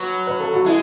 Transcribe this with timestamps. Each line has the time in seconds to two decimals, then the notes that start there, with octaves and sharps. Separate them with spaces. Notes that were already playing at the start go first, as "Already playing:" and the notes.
Already playing: F#3 B4
0.27 B4
0.40 A4
0.53 F#4
0.66 G#3 E4